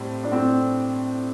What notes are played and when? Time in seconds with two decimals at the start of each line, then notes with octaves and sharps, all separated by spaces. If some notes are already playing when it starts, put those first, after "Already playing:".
Already playing: A2 G3 C4
0.24 D4
0.32 A2 C4